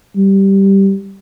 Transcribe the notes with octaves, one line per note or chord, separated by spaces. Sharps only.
G3